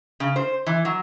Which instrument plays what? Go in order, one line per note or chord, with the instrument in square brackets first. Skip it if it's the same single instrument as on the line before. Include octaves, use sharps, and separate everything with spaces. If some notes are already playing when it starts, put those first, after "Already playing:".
[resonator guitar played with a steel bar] C#3
C5
E3
F#3